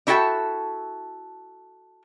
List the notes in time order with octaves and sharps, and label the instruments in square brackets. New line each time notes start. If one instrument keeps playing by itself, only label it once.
[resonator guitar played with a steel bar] D4 E4 F#4 A4 G5 A5